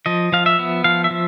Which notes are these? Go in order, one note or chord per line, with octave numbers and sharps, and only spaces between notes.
F3 D#5
F3 F5
E5
B3
F3 F5
E5
F3